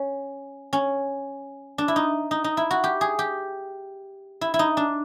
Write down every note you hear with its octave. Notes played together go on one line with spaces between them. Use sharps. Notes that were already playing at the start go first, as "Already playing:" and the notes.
Already playing: C#4
C#4
D4
E4
D#4
D#4
D#4
E4
F#4
G4
G#4
G4
E4
E4
D#4
D4